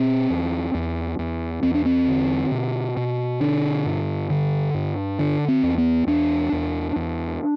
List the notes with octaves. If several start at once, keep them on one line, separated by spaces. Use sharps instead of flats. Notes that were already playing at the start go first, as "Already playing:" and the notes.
Already playing: B2 C4
E2
E2
E2
E2 C4
D4
C4
D3
B2
B2
D3 D4
G2
D3
G2
D3 D4
C4
E2
B3
E2 D4
E2
E2